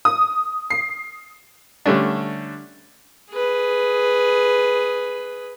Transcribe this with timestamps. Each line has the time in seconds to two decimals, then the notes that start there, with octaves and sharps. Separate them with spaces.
0.05 D#6
0.70 C7
1.86 D3 G3 A3 C#4 D4
3.31 G#4 B4